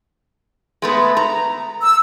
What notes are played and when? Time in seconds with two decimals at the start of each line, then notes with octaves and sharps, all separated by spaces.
0.82 G#3 A3 B3
1.17 A#5
1.82 E6